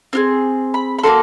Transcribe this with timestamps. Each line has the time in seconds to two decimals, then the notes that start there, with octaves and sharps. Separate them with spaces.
0.13 C4 F4 G#4
0.74 B5
0.99 B5
1.04 A#3 D#4 F#4 A4 C6